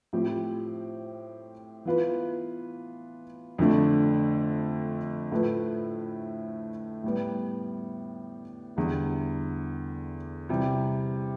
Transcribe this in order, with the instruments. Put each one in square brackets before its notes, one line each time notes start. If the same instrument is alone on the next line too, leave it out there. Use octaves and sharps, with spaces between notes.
[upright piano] A2 F3 C4 G4
E3 B3 F4 B4
F2 D3 A3 D4
A2 F3 A3 E4 B4
A2 G3 B3
E2 D3 G3
C3 E3 G3